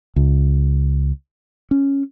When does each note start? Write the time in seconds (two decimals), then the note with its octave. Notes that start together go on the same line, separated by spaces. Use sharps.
0.16 C#2
1.71 C#4